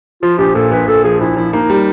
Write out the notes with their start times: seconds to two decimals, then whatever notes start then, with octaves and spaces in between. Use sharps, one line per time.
0.22 F3 F4
0.38 A#1 G4
0.55 A#2 A4
0.71 A#1 B4
0.88 A#2 A4
1.04 F3 G#4
1.20 A#1 E4
1.37 F3 E4
1.53 A#3 D#4
1.70 G3